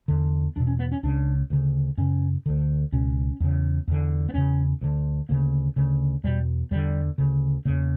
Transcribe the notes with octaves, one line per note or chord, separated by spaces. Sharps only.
E2 D3
E2 B2 D4
C#4
B3
C#4
C#2 C#3 D4
D2 C#3
F#2 C#3 C#4
D2 D3
C#2 B2 C#4
E2 C#3
E2 D3
B3
E2 C#3 C#4
D2 D3
D2 C#3 A#3
D2 C#3
E2 B2 G3
E2 D3 G3
D2 C#3
E2 C#3 A#3